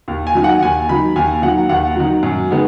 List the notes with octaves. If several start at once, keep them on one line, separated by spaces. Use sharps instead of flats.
D#2
G#5
D#3 F#3
F#5
D#2 G#5
D#3 F#3 B5
D#2 G#5
D#3 F#3 F#5
D#2 F#5
D#3 F#3
F#2
D#3 G#3 B3